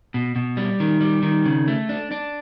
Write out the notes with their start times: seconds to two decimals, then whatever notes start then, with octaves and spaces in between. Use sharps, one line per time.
0.14 B2
0.36 B2
0.57 G3
0.80 D#3
1.01 G3
1.23 D#3
1.45 C#3
1.68 A3
1.89 D4
2.12 D4